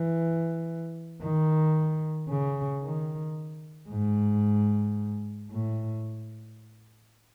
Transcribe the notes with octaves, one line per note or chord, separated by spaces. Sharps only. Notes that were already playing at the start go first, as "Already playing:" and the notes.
Already playing: E3
D#3
C#3
D#3
G#2
A2